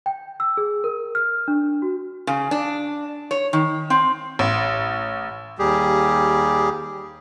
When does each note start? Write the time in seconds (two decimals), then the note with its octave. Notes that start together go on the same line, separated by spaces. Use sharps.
0.06 G5
0.40 E6
0.57 G#4
0.84 A#4
1.15 F6
1.48 D4
1.82 F#4
2.27 C#3
2.51 D4
3.31 C#5
3.53 D#3
3.90 C4
4.39 A1
5.59 D#2 G3 G4 G#4